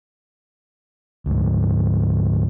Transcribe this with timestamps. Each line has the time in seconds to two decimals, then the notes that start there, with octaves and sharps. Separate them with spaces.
1.26 D2 G#2